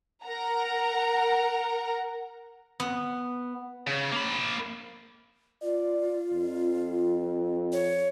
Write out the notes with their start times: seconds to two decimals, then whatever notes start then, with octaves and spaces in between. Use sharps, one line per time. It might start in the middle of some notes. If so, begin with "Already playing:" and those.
0.25 A#4 F#5 A#5
2.80 B3
3.87 C#3
4.12 A#3 B5
5.62 F4 D5
6.33 F2
7.72 C#5